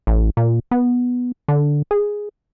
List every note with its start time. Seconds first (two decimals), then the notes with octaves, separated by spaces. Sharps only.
0.07 A1
0.37 A#2
0.71 B3
1.48 D3
1.91 G#4